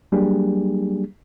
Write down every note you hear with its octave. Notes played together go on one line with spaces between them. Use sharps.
F#3 G3 A#3 D4 G4 G#4